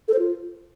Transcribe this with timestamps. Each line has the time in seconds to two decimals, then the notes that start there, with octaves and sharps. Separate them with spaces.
0.08 A4
0.14 C5
0.19 F4